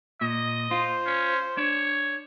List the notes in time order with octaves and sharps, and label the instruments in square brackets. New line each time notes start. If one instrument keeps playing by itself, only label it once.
[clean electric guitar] A#2 [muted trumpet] D#5
[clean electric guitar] F4 [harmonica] C5
[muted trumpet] C#4
[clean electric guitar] D4 [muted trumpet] C#5